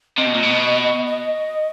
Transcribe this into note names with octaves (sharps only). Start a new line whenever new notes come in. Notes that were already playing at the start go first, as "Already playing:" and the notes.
C3 D#5
B2
A#2
B2
D#5